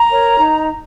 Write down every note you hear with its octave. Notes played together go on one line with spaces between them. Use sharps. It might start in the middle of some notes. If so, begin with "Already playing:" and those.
Already playing: A#5
A#4 C#5
D#4